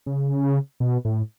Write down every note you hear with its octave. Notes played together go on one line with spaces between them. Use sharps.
C#3
B2
A2